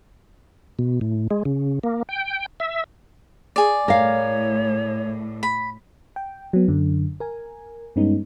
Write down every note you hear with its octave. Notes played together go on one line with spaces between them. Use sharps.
B2
A2
G#3
C#3
A#3
G5
E5
G#4 D5
A2 A#4 C#5 F5
B5
G5
F#3 B3
F#2 D3
A#4 G#5
G2 G#3 B3 C#4 D#4